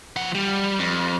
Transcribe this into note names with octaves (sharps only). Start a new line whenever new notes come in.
F3 F#5
G3
F2